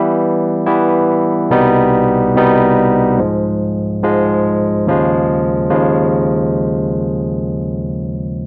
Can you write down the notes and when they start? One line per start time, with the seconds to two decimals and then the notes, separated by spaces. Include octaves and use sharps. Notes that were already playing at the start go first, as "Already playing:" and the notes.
Already playing: E3 G3 B3 E4
0.66 E3 G3 B3 E4
1.50 C2 B2 G3 B3 D#4
2.35 C2 B2 G3 B3 D#4
3.18 G#2 F3 G#3
4.03 G#2 F3 G#3
4.87 D#2 C#3 F3 G#3
5.70 D#2 C#3 F3 G#3